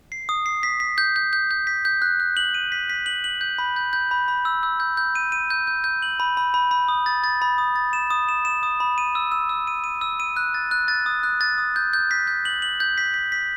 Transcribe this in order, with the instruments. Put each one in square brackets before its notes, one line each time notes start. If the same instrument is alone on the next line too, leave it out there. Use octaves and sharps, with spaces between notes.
[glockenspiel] C7
D#6
C7
B6
B6
G6
G6
G6
G6
B6
G6
F#6
F#6
F#7
D#7
B6
B6
F#7
F#7
G6
B5
G6
G6
B5
B5
E6
E6
G6
G6
D#7
D#7
G6
G6
G6
F#7
B5
B5
B5
B5
D#6
A6
A6
B5
D#6
A6
E7
D#6
E7
E7
D#6
B5
D#7
E6
E6
E6
D#7
D#7
E6
D#7
F#6
A6
F#6
A6
D#6
F#6
A6
D#6
G6
G6
B6
G6
F#7
F#7
G6
B6
B6
B6